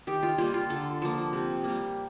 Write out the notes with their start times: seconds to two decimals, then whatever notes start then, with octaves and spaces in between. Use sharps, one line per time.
0.07 D#3 G4
0.23 F4
0.38 G3 A#3 F4
0.54 F4
0.70 D3 A4
1.02 F3 A#3
1.33 C3
1.64 G3 A#3